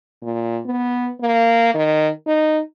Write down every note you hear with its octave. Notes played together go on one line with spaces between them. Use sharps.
A#2
B3
A#3
D#3
D#4